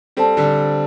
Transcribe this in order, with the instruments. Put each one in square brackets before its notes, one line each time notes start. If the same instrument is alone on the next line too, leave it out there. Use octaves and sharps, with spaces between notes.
[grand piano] G3 C4 [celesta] A4 C5 A5
[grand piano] D3 G3